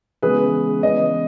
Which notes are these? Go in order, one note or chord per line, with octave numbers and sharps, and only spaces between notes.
C#3 E3 G#3 B3 G#4 B4
C#3 E3 B3 B4 D#5